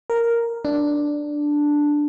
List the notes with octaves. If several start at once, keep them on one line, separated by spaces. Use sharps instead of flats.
A#4
D4